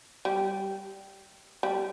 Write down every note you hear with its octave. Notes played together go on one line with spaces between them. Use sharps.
G3
G3